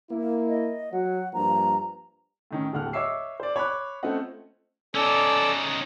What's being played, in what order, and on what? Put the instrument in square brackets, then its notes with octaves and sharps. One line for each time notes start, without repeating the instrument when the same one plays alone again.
[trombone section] A#3 E4
[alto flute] D#5
[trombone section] F#3 [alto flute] F#5
[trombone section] G2 F3 A#3 [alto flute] A#5
[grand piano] A2 D#3 C#4
D1 D#2 D3 F#5 G5 F6
C#5 D#5 E5 D6 E6 C7
C5 D5
C#5 B5 D6 F#6
A3 C4 C#4 F4 D#5 F#5
[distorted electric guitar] C#4 D#4 [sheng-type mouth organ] A4 D5 E6